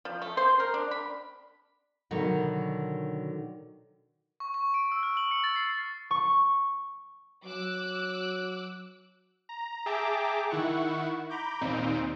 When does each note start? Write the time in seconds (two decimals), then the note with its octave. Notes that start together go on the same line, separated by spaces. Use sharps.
0.05 F3
0.22 A3
0.37 C5
0.60 A#4
0.74 D4
0.91 B5
2.11 B2 D3 D#3 F#3 F#4
4.40 C#6
4.54 C#6
4.74 D7
4.92 E6
5.03 F6
5.17 F#7
5.31 C#7
5.44 A6
5.56 C7
6.11 C#6
7.45 F#3 D6 E6 F#6
9.49 A#5
9.86 G#4 E5 G5 A5 A#5 D6
10.50 D#3 E4 F#5 C#6
11.30 A#5 B5 D6 G6
11.61 D#2 A#2 C4 D#4 D7